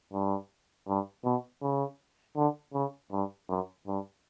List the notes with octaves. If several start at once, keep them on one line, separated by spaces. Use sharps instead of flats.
G2
G2
B2
C#3
D3
C#3
G2
F#2
G2